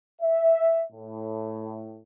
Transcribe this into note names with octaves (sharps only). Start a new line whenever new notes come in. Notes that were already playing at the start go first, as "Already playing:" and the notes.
E5
A2